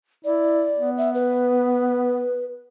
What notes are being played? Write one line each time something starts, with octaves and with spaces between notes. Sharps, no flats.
E4 D5
B3
E5
B4